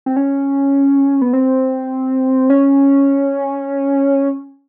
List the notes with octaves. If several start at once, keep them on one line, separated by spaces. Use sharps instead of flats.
C4
C#4
B3
C4
C#4